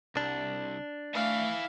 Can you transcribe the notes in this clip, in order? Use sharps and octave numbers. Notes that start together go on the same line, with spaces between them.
C2 D4
A3 E4 F5 G#5